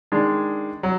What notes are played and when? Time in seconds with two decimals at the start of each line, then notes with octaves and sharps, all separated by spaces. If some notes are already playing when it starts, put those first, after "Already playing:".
0.12 D#3 G#3 D4
0.83 F#3